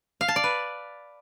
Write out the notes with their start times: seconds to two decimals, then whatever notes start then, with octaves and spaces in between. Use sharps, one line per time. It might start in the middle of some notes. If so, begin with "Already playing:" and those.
0.21 F5
0.28 A5
0.36 D5
0.44 B4